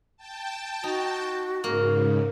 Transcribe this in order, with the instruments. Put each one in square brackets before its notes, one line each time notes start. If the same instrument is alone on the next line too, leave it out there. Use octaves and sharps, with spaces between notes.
[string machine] G5 A5
[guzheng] D#4 [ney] F#4
[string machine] G#2 C#3 [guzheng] A#3